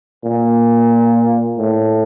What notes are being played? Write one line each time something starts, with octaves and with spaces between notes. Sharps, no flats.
A#2
A2